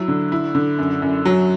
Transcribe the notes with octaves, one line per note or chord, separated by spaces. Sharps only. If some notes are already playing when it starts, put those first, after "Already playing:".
Already playing: F#3 E4
D3
E4
D3
F#2
F#2
F#3